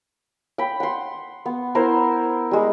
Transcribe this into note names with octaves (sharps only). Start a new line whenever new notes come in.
G5 B5
F#5 C6
B3
B3 E4 A#4 C5
G3 G#3